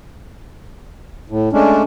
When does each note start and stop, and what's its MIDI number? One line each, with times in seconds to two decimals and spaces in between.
1.30 1.49 45
1.53 1.83 56
1.53 1.83 57
1.53 1.83 61
1.53 1.83 62